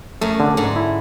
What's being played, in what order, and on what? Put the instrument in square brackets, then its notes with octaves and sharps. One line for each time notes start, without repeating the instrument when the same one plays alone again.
[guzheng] F#2 [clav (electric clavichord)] A3
[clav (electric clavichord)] D3
[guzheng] G#2 [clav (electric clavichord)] D3
[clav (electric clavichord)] E4